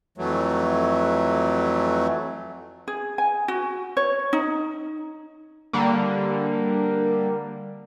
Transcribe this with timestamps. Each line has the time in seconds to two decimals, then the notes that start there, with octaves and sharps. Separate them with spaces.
0.18 F2 E3 F#3 A3
2.88 G#4
3.18 G#5
3.48 F#4
3.97 C#5
4.33 D#4
5.73 D3 G3 A#3